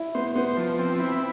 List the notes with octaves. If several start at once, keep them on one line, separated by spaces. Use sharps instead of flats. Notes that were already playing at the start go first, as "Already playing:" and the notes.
Already playing: E4
B3 C5
B3 C5
F3
C4
E4